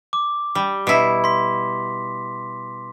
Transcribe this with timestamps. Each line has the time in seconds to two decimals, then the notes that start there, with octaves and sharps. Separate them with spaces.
0.13 D6
0.55 G3
0.87 B2 E4
1.24 C6 B6